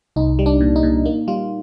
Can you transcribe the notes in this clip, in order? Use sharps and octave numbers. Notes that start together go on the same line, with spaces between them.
C2 D#4
G3
D4
A#2
D#4
A#2
A#3 D#4
G3 F4